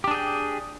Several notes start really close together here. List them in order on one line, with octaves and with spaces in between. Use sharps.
G4 D4 G#4 G5